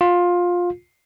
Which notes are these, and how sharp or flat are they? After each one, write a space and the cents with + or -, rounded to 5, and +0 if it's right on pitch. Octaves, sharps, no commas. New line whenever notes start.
F4 +15